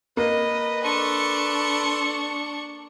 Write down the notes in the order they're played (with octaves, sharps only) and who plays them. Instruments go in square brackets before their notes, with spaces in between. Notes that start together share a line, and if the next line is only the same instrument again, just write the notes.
[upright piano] A#3 [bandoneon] B4 [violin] D#5
[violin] D4 C#6 [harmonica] A4 C6